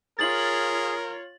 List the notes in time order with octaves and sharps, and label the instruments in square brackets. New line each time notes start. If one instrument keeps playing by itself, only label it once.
[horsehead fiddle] F4 C#5 [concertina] G#4 [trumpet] A#4 [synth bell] A6 F#7